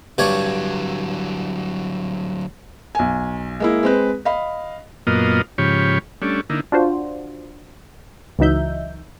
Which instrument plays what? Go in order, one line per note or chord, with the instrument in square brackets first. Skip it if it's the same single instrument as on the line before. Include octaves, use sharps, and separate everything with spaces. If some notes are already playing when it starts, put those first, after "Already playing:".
[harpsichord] G2 D4 C#5 [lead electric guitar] D3 F#3
[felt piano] B1 G#5
G#3 A#3 E4
G#3 C4 B4
D#5 F5 B5
[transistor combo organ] F#2 A#2 A#3 B3 F4 D#5
G#2 C#3 F3 G4 C#5 B5
G3 A3 C#4 D4
D3 A#3 D#4 E4
[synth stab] D4 F4 F#4 C5
C#2 E3 F#3 D#4 E5 G6